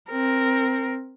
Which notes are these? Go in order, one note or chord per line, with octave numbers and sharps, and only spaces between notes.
C4 A#4